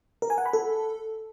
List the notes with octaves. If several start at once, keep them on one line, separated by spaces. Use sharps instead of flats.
A#4
G#5
F#5
B5
A4